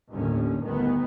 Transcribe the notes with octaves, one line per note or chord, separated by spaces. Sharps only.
G1 D#2 A2 D3 C#4
G1 D2 D#3 B3